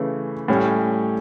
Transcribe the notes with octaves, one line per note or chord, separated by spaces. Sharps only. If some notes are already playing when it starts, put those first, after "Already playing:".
Already playing: C#3 E3 A3
A2 G3 C#4